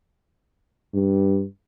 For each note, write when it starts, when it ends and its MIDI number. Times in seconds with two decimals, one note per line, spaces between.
0.94 1.44 43